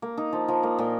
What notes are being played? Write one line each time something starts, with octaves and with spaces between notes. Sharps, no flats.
A#3
D#4
F3
F3
A#3
A#2